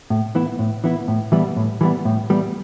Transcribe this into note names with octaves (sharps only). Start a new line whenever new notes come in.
A2
E3 B3 E4
A2
E3 B3 E4
A2
E3 G3 B3
A2
E3 G3 B3
A2
E3 G3 B3